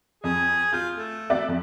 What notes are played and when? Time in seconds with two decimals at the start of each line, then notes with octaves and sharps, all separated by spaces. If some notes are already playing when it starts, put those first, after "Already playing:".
0.24 F2 G#4
0.73 F4 G6
0.96 A3
1.30 D5 E5 F#6
1.48 F2